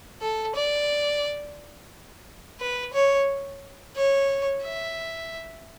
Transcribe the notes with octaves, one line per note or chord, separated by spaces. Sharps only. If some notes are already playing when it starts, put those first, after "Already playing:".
A4
D5
B4
C#5
C#5
E5